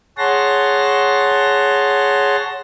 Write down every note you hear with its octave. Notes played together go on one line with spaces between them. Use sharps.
G#4 C#5 F#5 A5 C6 A#6